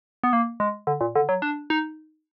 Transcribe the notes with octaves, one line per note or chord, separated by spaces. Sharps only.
B3
A#3
G#3
D3
A#2
D3
F#3
D4
D#4